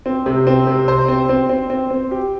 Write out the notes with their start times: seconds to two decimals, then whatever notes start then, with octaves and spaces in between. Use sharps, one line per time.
0.06 C4
0.26 C3
0.47 C4
0.67 C3
0.88 C5
1.08 C4
1.29 C4
1.49 C4
1.70 C4
1.90 C4
2.11 G4